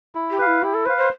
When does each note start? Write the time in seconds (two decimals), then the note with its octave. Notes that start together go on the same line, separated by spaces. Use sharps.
0.15 E4
0.31 G4
0.39 B4 F5
0.47 E4
0.63 E4 G4
0.74 A4
0.86 B4 C5
0.89 F5
0.97 C5